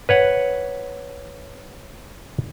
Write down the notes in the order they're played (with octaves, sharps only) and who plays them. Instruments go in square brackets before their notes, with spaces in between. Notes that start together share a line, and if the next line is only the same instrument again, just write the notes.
[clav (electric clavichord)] B4 C#5 F#5